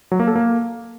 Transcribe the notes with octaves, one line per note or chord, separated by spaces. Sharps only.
F#3
A#3
A4
A#3